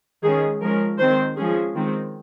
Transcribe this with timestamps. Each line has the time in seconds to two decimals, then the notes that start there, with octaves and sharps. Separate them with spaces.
0.23 D#3 G#3 C#4 G#4
0.61 F3 G#3 C#4 A#4
0.99 D#3 G#3 C4 C5
1.37 F3 G#3 C#4 G#4
1.75 D#3 G#3 C4